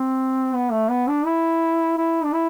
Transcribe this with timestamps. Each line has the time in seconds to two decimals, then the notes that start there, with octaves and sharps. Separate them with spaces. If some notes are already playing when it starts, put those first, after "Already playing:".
Already playing: C4
0.54 B3
0.72 A3
0.90 B3
1.08 D4
1.26 E4
1.97 E4
2.23 D4
2.33 E4